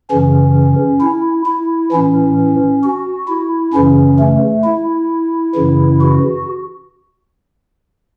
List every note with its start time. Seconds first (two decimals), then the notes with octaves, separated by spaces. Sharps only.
0.10 F#2 C#3 E3 C#4
1.01 E4
1.46 E4
1.92 A2 E3 C#4
2.84 F#4
3.28 E4
3.73 F#2 C#3 E3 C#4
4.19 A3
4.64 E4
5.55 F#2 C#3 E3
6.01 F#4